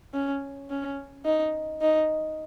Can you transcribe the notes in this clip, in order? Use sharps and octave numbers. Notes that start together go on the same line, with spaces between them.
C#4
C#4
D#4
D#4